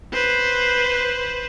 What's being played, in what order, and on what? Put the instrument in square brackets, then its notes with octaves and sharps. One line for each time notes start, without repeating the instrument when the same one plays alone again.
[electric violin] B4 C5